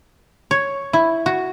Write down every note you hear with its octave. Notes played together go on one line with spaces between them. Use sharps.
C#5
E4
F#4